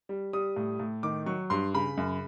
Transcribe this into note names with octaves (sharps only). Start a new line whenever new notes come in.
G3
G3 D#6
A2
A2
D#3 D6
F#3 C#6
G2 C6
C#3 B5
F#2